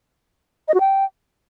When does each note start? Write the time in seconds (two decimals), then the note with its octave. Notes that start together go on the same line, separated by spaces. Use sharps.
0.68 D#5
0.74 F#4
0.80 G5